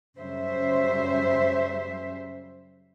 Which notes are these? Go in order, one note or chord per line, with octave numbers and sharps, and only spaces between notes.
F#2 C#3 G3 C5 E5